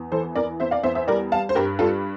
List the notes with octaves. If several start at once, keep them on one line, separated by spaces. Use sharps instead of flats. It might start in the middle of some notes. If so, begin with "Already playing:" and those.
Already playing: E2
E3 A4 C5
E2 A#4 D5
E2 C5 E5
D5 F5
E2 C5 E5
C5 E5
G3 A#4 D5
G3 F5 A5
C5
G2 G4 A#4
G3 F4 A4